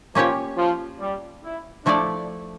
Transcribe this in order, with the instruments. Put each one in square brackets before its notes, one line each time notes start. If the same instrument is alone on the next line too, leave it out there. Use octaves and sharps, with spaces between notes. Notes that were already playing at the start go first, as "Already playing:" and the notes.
[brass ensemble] F3 [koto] A#3 C#4 G4 C#5
[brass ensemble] F3
G3
E4
[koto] F3 A3 E4 A4 D5 [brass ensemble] D4